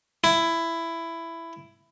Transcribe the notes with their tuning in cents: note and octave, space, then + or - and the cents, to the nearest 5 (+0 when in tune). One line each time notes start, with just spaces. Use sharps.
E4 +10